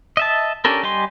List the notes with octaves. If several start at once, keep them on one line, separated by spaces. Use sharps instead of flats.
D#5 E5 A5
C#4 D4 G4 A4 A#4
G3 G4 D#5 G#5 C6